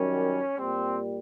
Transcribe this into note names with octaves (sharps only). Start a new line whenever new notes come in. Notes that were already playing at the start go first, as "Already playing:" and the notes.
Already playing: F#2 D#3 G3 C#4
A#2 G3 C4